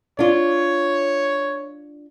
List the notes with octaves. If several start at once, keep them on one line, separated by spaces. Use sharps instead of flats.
D4 F4 C#5